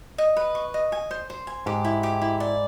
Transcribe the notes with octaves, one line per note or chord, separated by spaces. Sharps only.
D#5
B4
C#6
D#5
G#5
C5
C5
G#5
G#2 G4
E4
G4
E4
D5